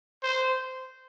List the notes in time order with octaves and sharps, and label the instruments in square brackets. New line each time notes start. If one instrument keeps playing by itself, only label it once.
[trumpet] C5